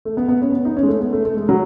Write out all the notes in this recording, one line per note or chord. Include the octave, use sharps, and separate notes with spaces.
A3
B3
B3
C#4
B3
D#4
C#4
G#3
A3
B3
A3
A3
G#3
F#3